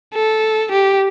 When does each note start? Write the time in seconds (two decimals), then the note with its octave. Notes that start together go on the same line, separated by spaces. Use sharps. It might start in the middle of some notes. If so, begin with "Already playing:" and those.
0.14 A4
0.71 G4